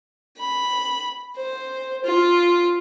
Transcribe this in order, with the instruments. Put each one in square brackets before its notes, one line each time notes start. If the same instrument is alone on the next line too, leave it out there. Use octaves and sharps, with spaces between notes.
[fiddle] B5
C5
F4